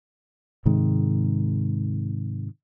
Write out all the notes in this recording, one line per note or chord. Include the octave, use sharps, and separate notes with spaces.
G#2 C3 D#3 G#3